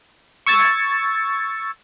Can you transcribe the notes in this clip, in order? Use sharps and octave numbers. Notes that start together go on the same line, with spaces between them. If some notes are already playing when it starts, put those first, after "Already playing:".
C#6 E6 G#6 A6